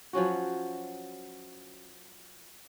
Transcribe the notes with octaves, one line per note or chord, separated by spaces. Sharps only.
F3 F#3 C#4 F#4